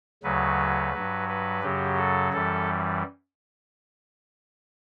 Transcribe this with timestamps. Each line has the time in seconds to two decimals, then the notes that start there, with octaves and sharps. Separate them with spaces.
0.23 D2 C#3 F#3 B4
0.94 G2 F#3
1.29 B4
1.63 F#2 C#3 F#3 G4
1.98 A4
2.33 F#2 E3 G3 A4